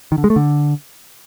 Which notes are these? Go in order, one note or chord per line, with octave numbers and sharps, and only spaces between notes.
D#3
D3
G#3
A3
D3